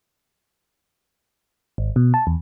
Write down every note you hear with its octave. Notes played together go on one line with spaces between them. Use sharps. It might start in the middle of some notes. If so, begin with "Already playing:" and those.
G#1
B2
A5
E2